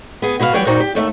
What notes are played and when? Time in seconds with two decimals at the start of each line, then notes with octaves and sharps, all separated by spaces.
0.22 B3 G#4
0.39 B2 F#4 B4 C5 F5
0.53 E3 F#3 G3 C#5 D5 G5
0.66 A#2 D#4 F#4 C5 D5 G5
0.80 G4
0.95 D#2 A3 D5 E5